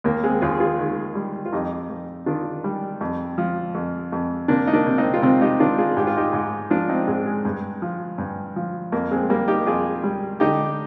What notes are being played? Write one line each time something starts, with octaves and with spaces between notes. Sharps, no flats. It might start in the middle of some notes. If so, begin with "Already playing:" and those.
D#2 A#3
G#3 C4
D#2 F4 G#4
F4 G#4
D#3
G3
F4
F2 D#4 G4
F2
D#3 D4 F4
G3
F2
F3
F2
F2
C3 A#3 D4
D#4
A#3 D4
C3
C4 D#4
F4
C3 C4 D#4
D#4 G4
D#3 D4 F4
F4 G#4
G#2 G4
F4
D#4 G4
G#2
F3 D4 F4
C4 D#4
G#2 G#3 C4
G#3
G2
F3
G2
F3
F2 A#3
G#3 C4
G3 A#3
D#4 G4
F2 F4 G#4
G3
D3 D#4 G4